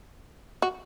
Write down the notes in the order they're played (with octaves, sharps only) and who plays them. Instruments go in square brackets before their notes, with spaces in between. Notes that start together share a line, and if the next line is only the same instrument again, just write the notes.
[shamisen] F#4